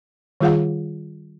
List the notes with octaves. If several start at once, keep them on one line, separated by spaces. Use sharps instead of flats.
D#3 G3 F4 G#4 F5 F#5